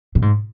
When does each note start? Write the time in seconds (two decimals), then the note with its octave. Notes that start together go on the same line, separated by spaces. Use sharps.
0.15 A#2
0.22 G#2